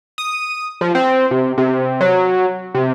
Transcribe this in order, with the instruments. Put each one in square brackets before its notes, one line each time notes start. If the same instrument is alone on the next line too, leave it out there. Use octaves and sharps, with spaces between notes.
[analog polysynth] D#6
F3
C4
C3
C3
F#3
C3